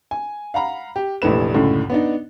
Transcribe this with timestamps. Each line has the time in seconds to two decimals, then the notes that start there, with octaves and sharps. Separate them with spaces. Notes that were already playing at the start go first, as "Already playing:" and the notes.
0.11 G#5
0.54 F5 F#5 A#5 B5
0.96 G4
1.22 F1 A#1 E3 A3 B4 E7
1.54 C#2 F#2 A2 D3
1.90 B3 D4 D#4